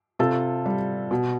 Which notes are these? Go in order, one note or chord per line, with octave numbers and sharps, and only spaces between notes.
C3 F4 A4
G3
B2